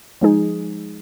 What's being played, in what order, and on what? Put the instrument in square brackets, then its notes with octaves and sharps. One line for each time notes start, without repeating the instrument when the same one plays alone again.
[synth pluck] F3 G#3 D#4 G#4